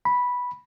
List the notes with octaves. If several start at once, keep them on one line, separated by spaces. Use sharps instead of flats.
B5